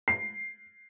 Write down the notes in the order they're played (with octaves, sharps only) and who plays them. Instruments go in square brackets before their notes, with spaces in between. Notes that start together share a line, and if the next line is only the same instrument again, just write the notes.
[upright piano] C7